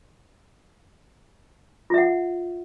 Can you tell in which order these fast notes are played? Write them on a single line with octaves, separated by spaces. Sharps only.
F4 E5 F#5